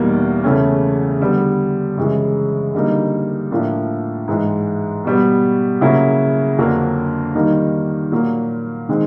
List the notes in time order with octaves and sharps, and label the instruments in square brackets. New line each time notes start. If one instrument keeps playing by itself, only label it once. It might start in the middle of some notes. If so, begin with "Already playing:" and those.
Already playing: [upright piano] E2 B2 G3 A#3 D#4
E2 C#3 E3 A3 C#4
D3 G3 B3
F#2 C#3 E3 G#3
D3 G3 A#3 D#4
A2 F3 A#3 D4
G#2 E3 G#3
B2 G3 B3
C#3 F#3 A#3 C#4 E4
F2 D3 F#3 A#3 D4
D#3 G3 A#3 D#4
A#2 F#3 A#3
D#3 G#3 C4